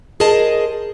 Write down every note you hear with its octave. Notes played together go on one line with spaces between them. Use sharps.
G#4 A#4 C5 D#5 A5